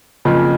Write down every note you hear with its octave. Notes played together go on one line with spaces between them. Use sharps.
F#1 F2 C#3 F3